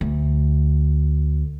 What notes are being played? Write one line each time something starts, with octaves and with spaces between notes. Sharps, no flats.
D2